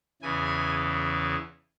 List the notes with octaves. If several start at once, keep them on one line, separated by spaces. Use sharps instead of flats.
E2 C#3 E3 G#5